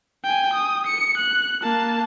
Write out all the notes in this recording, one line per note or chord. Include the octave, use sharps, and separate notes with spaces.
G5 G#5
D#6
C#7
F#6
A#3 A5